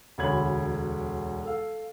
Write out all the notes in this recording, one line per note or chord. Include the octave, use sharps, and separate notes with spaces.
E1 D2 C#5 B5 G#6 F#7
A4 F5